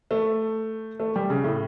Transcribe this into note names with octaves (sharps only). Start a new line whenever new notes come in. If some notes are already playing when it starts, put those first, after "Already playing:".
A3
A3
G3
C#3
A2